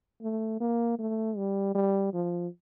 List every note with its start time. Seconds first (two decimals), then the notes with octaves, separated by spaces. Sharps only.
0.22 A3
0.60 A#3
0.99 A3
1.37 G3
1.75 G3
2.13 F3